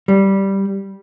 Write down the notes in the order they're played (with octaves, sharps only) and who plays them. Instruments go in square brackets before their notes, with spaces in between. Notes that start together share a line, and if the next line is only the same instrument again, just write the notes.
[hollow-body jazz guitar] G3